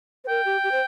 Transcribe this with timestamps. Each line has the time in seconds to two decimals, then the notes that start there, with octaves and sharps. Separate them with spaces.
0.24 C5
0.28 A#4 G5
0.45 G4
0.63 G4
0.72 C5